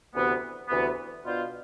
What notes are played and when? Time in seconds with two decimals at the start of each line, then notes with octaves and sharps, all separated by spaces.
0.14 D2 C3 E3 B3
0.68 D2 C3 E3 B3
1.24 B2 B3 D4 F4 C5